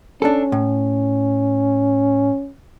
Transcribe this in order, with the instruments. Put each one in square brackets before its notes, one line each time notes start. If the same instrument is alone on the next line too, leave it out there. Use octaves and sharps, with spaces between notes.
[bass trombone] C#4 [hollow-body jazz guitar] D4 A4
[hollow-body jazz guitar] A2